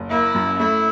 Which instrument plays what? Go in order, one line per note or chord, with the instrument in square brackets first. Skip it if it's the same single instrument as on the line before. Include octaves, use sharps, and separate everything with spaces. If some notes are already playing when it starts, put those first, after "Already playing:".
Already playing: [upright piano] F#1
[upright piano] A#3 [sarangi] E4
[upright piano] F#2
[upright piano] A3 [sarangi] E4